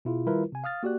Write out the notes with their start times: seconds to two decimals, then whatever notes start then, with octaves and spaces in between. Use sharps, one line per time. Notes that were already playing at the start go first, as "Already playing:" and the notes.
0.05 B2 E4 F4 G#4
0.26 D#3 G3 E4 F4 A#4 B4
0.52 C3 G#5
0.64 F5 D#6 F6 A6
0.83 A#3 F#4 G4 D5 F#6